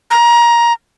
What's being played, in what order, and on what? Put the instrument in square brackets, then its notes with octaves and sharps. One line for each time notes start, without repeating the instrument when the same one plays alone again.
[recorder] A#5